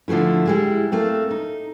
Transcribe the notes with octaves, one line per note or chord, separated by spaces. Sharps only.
D3 F3 F#3 A3 E4
G3 G#3 E4
A3 A#3 C4
D#4